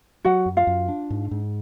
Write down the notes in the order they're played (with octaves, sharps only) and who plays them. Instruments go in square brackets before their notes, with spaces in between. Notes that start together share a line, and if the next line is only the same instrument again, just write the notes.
[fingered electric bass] F#3 [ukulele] F#4 F#5
[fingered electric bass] F#2
[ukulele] F4 F5
[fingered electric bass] F#2
D4
G#2
G#2